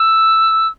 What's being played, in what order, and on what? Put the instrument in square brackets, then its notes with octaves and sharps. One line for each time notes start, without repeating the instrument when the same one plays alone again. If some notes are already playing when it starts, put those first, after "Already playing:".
Already playing: [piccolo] E6